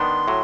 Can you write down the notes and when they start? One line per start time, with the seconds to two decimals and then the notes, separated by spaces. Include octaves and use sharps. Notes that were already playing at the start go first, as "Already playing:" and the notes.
Already playing: D#3 B3 D4 C6
0.28 A2 F#3